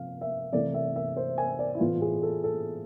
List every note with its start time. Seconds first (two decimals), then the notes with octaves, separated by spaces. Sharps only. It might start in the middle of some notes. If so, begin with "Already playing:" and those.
Already playing: C3 F3 F5
0.21 E5
0.53 C3 E3 A3 D5
0.74 E5
0.96 E5
1.17 C5
1.38 G#5
1.59 D5
1.75 E4
1.80 A2 E3 B3 F4
2.02 G#4
2.23 A4
2.44 A4